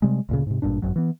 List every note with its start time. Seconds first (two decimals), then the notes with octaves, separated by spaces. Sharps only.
0.02 C3 G3 G#3
0.29 D2 A#2 C#3
0.47 G#2 C3
0.62 G#1 G2 A#2 D4
0.82 G#1 F#2 F#3
0.96 E3 B3